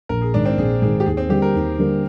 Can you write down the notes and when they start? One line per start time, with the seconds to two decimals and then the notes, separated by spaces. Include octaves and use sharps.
0.09 A#1 A#4
0.21 G#4
0.33 G#2 D#3 D4
0.45 C4
0.57 A#1 G#4
0.82 G#2 D#3 G#4
1.00 G4
1.06 D#2 G#4
1.17 C4
1.29 D3 G3 A#3 G4
1.42 A#4
1.54 D#2
1.78 D3 G3 A#3